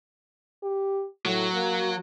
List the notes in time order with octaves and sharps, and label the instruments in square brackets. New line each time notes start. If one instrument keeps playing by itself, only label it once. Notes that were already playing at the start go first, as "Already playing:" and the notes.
[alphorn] G4
[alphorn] A2 [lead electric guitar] F#3
[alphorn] A#3